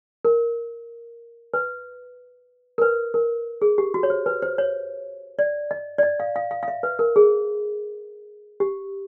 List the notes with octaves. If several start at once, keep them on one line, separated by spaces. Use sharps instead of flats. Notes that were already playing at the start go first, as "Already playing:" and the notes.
A#4
B4
A#4
B4
A#4
G#4
G4
F#4
C#5
C5
B4
C5
C#5
D5
D#5
D5
D#5
F5
F5
F5
F5
E5
B4
A#4
G#4
G4